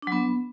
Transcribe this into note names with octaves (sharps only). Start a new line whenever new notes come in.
F#3 B3 D4